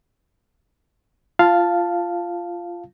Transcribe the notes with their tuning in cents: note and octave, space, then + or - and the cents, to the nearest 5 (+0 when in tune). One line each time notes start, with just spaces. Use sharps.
F4 -15 F5 +0 A5 +0